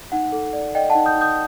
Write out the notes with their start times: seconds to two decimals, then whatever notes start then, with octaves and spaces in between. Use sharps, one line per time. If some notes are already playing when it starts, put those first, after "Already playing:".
0.12 D#4 F#5
0.32 A4
0.53 D5
0.75 D5 D#5 G5
0.90 F#5 A5
0.95 D#4
1.06 D#6 G6
1.16 D#4
1.21 D#6 G6